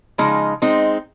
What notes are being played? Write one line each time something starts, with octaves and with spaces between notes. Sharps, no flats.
C#3 F3 G#3 D#4
G#3 C4 D#4